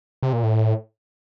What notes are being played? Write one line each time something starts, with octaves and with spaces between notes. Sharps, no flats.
C3
A#2
A2